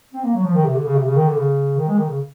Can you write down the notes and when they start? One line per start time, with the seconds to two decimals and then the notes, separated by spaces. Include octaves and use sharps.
0.14 C4
0.24 A#3
0.34 F#3
0.44 F3
0.55 D#3
0.65 C3
0.75 D3
0.85 C#3
0.96 C3
1.06 C#3
1.16 D#3
1.27 D3
1.37 C#3
1.78 D#3
1.88 G#3
1.98 D#3
2.08 C#3